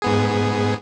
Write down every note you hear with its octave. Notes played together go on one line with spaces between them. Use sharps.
G#2 B3 G#4